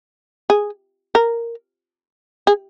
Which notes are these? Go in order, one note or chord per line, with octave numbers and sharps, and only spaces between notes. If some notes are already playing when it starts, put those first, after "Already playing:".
G#4
A#4
G#4